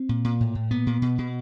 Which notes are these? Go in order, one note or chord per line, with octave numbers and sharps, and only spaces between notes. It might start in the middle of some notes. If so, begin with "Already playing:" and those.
Already playing: C4
A#2
A#2
A2
A2
A#2 B3
A#2
B2
B2